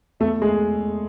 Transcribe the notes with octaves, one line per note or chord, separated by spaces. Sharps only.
E2 A3 A4
G#3 G#4